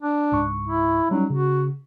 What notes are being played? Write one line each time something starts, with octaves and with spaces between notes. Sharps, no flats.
D4
C#2 G#2 C#6
E4
F#3 G3 C#4 D#4
C#3 F#4